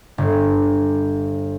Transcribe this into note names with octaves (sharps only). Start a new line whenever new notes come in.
G1